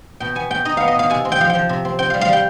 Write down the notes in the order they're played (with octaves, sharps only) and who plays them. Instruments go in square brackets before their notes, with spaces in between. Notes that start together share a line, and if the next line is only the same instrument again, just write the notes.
[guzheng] B2 G5
B3 G#5
B2 G5
D#4 D#5
B3 F5
D#5
B2 F5
C3 G#5
C4
G5
F3 F5
G5
F3
C3
C4
C4 G5
G3 F5
F5
G3 G5